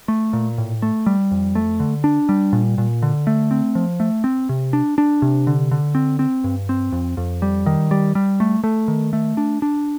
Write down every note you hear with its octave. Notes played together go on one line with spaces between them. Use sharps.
A3
A#2
A2
A3
G3
F2
A3
D3
D4
G3
A#2
A#2
D3
A3
C4
F3
A3
C4
C3
D4
D4
C3
D3
D3
C4
C4
G2
C4
F2
F2
G3
D#3
G3
G3
A3
A3
D#3
A3
D4
D4